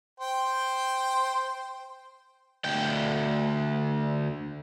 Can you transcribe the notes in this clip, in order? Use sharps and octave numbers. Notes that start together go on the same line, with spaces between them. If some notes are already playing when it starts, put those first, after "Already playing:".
C5 G5
D2 G5